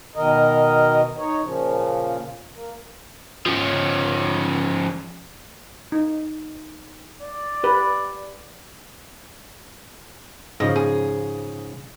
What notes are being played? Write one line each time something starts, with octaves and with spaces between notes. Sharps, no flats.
B2 D#3 A#4 D#5
D#4 C#5
A#2 C#3 F3
A#3
F3 C#4
D#4
D5
G4 B4
G#2 C#3 F3 D#5
G#4